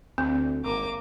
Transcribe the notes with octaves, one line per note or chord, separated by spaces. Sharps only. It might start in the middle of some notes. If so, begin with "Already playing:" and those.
D2 C4
G#1 A#3 D6